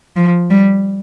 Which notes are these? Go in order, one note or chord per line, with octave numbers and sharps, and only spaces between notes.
F3
G3